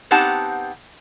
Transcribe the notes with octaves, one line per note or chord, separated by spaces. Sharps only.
B3 C4 D#4 G4 F#5 A5